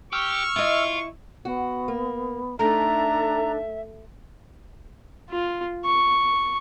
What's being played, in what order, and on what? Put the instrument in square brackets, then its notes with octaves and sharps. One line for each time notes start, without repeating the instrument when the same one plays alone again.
[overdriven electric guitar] G4 [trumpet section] C#6 [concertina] E6 F6
[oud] E4 D#5 [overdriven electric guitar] F4
[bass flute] B3 [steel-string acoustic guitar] F#4
[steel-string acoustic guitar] A#3
[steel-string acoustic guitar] A3 [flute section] D4 D#4 A4 [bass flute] E5 [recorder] A#5
[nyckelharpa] F4
C#6